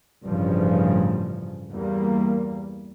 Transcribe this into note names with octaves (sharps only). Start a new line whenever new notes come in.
A1 G2 C#3 F3
E2 G3 A#3